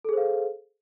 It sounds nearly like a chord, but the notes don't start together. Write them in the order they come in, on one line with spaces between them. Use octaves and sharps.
A4 G#4 C5 F5